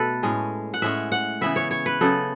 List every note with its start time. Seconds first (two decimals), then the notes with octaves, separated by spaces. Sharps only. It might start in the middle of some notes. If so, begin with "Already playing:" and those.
Already playing: B2 A3 A4 B4
0.23 A2 G#3 C#4
0.74 F#5
0.82 A2 G#3 C#4 E5
1.12 F#5
1.41 C#3 E3 B3 E5
1.56 C#5
1.71 C#5
1.86 B4
2.01 C#3 F#3 B3 A4